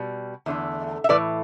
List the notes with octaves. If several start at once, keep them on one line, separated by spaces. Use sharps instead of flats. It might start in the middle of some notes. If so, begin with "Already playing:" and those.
Already playing: B2 G3
E2 D3 A3
E5
A2 E3 A3 B4 D5